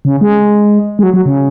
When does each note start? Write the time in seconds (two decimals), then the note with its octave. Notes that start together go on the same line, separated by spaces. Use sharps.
0.05 C#3
0.21 G#3
0.99 G#3
1.03 F#3
1.14 F#3
1.26 C#3